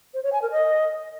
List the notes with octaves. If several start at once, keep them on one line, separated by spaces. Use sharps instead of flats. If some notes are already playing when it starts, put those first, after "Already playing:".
C5
C#5
G#5
A#4
D#5